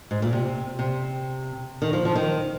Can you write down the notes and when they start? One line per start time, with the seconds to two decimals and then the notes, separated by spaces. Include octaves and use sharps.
0.11 G#2
0.22 A#2
0.32 C3
0.79 C3
1.82 D#3
1.93 F3
2.05 F3
2.15 D#3